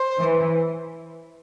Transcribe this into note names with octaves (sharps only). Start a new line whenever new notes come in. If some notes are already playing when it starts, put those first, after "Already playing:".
Already playing: C5
E3